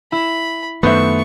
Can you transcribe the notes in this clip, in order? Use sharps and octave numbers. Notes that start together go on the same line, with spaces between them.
E4 B5
F#2 D#3 A3 B3 B4 C5 E5 C#6